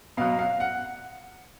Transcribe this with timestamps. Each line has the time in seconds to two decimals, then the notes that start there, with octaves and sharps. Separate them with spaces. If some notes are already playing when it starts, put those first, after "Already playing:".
0.17 B2 F#3 F5
0.39 F5
0.60 F#5